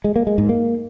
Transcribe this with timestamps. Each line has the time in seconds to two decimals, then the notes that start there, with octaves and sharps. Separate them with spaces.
0.04 G#3
0.16 A#3
0.27 G#3
0.38 G#2
0.49 A#3